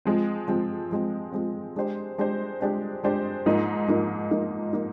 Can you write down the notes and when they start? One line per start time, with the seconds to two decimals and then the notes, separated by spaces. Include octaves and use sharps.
0.05 F3 G#3 C4
0.48 F3 G#3 C4
0.91 F3 G#3 C4
1.32 F3 G#3 C4
1.76 G#3 D4 G4 C5
2.18 G#3 D4 G4 C5
2.61 G#3 D4 G4 C5
3.04 G#3 D4 G4 C5
3.46 G#2 F3 A#3 D#4
3.88 G#2 F3 A#3 D#4
4.31 G#2 F3 A#3 D#4
4.73 F3 A#3 D#4